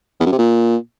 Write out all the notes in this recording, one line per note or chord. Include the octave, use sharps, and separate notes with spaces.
E2
F#2
C3
A#2